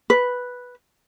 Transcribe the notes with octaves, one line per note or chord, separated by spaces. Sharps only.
B4